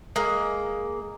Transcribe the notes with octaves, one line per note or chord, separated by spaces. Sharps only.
G#3 A#3